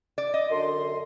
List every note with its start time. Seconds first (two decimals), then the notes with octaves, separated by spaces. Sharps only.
0.18 D5
0.34 D#5
0.50 F#2 D3 C6